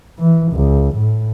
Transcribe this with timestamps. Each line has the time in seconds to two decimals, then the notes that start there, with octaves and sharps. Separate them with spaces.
0.18 E3
0.53 C#2
0.96 A2